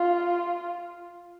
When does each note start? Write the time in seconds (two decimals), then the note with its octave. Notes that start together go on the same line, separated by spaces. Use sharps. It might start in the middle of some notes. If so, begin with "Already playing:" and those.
Already playing: F4